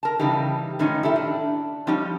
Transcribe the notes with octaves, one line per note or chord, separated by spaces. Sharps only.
A#4 A5
C#3 E3 G3 D#4 G4
A2 D#3 F3 C#4 D#4
E4 G4 A4 E5
D4
F3 G3 C#4 D#4 G4